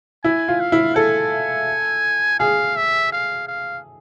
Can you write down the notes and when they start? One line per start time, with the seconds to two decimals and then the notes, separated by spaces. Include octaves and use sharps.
0.24 E4 G#5
0.48 F4
0.60 F5
0.72 E4
0.95 A4 G#5
2.39 G#4 F5
2.76 E5
3.12 F5
3.47 F5